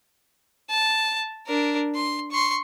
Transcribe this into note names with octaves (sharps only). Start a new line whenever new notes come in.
A5
D4 A#4
C6
C6 C#6